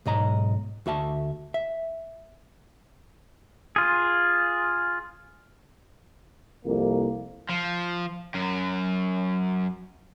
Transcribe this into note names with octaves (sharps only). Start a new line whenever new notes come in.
B1 G#2 D#5 A#5
D2 F#4 E5 A5
E5
F4 G#4
C2 F2 A#3
F3
F#2